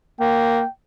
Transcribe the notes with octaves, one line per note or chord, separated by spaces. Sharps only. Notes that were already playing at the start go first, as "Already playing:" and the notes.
A#3 G5